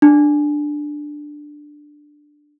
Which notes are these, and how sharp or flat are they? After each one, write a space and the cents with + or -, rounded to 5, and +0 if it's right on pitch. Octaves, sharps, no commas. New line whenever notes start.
D4 +10